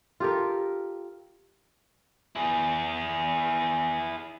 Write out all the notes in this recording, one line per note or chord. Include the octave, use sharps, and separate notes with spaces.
F4 G4 A4 A#4
E4 G#4